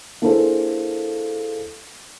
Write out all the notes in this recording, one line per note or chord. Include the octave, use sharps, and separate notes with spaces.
A#3 D4 E4 G#4 A4 C5